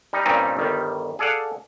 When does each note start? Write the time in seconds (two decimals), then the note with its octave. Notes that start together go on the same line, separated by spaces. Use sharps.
0.13 G3 D#4
0.26 G2 A#2 G3 C4 C#4 D#4
0.57 G1 D#3 G3
1.19 G#4 A4 D5 F5 F#5